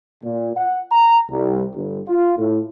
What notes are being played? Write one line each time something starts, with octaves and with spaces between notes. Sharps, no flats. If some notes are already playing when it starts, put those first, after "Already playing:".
A#2
F#5
A#5
C2
G1
F4
A2